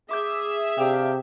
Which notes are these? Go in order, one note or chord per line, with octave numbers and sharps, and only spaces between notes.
G#4 E5 D6 G6
C3 D4 G4 F5